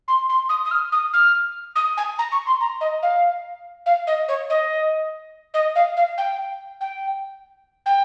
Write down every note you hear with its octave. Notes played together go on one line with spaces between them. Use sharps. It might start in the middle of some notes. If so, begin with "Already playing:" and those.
C6
C6
D#6
D#6
F6
D#6
F6
D#6
G#5
A#5
C#6
C6
A#5
D#5
F5
F5
D#5
C#5
D#5
D#5
F5
F5
G5
G5
G5